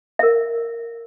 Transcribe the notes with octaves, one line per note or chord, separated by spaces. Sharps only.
A#4 E5